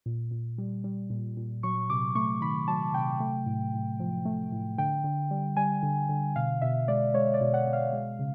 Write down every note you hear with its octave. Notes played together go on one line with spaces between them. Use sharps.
A#2
A#2
G3
G3
A#2
A#2
F#3 C#6
C3 D6
A3 C#6
D#3 B5
F#3 A5
C3 G5
A3
A2
A2
F3
A3
A2
D3 G5
D3
G3
G3 G#5
D3
D3
B2 F5
B2 E5
G#3 D5
G#3 C#5
D5
B2
F#5
B2
F5
G#3
C#3